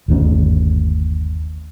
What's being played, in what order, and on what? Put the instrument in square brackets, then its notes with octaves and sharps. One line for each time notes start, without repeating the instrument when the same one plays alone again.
[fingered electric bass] G1 D#2 A3 C#4